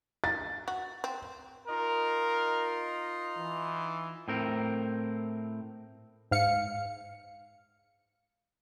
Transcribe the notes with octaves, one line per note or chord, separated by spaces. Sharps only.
A6
F#4
C4
D#4 F4 A#4 D#5
E3
A2 C4 A#4
G#2 F5 C#7